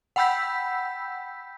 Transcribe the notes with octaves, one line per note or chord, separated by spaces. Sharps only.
F#5 G5 B5 E6 G6 B6